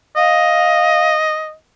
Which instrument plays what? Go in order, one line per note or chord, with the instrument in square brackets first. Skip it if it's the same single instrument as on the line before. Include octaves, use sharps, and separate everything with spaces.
[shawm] D#5 [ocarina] F5